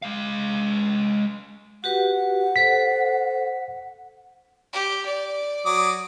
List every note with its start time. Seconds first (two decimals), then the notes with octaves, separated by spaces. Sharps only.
0.02 G#3 F5
1.84 F#4 G4 B4 F#5
2.56 A4 C5 B6
4.73 G4
5.06 D5
5.66 F#3 D6 D#6